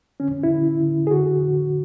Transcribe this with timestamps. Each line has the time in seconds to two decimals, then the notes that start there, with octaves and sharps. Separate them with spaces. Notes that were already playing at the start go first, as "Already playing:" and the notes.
0.20 D3 C#4
0.43 E4
0.50 D3
0.81 D3
1.07 G#4
1.11 D3 F#4
1.41 D3